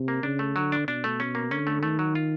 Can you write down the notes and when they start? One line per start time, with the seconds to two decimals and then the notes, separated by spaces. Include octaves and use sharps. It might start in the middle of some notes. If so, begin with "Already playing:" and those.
Already playing: C3
0.08 A#3
0.23 C#3 D4
0.39 A3
0.56 D3 F#3
0.72 D4
0.88 B2 D4
1.04 A3
1.20 C#4
1.35 A#3
1.51 D3 C#4
1.67 A3
1.83 D#3 A3
1.99 F#3
2.15 F4